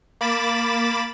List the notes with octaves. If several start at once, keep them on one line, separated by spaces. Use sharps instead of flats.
A#3 B5 D6 A6 E7